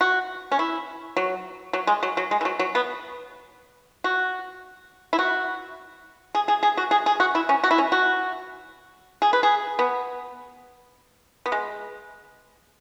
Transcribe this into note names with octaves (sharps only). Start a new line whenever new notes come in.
F#4
C#4
E4
F#3
F#3
G#3
F#3
F#3
G#3
E3
F#3
F#3
B3
F#4
E4
F#4
G#4
G#4
G#4
F#4
G#4
G#4
F#4
E4
C#4
F#4
E4
C#4
F#4
G#4
B4
G#4
B3
B3
G#3